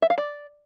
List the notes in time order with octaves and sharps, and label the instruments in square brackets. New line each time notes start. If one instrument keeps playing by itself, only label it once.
[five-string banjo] E5
F5
D5